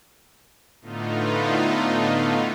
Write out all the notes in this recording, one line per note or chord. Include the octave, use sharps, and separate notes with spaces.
A2 D3 A3 B3 D#4 F4